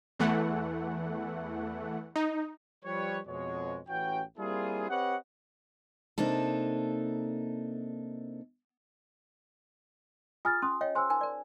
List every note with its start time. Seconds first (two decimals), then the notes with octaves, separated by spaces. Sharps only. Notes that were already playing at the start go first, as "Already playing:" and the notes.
0.19 E2 E3 A3 F#5
2.16 D#4
2.85 F3 G3 B4 C#5
3.28 F2 B2 G#3 C#5
3.88 A1 E3 C#4 F#4 G5
4.38 G3 A#3 C4 E4 F4 G#4
4.89 C4 G4 B4 C#5 D#5 F#5
6.18 C3 A#3 D4 D#4 A4
10.45 F4 G#4 G#5 D#6 F6 A6
10.62 C#4 C6 D#6
10.81 C#5 D#5 F5 G5
10.95 G#4 C5 G#5 C6 E6
11.10 D#4 A#4 G#5
11.21 A#4 D5